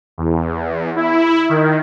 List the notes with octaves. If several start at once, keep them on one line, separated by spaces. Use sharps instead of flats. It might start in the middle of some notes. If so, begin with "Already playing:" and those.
E2
E4
D#3